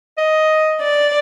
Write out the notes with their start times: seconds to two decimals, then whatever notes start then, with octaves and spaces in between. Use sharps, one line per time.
0.18 D#5
0.80 D5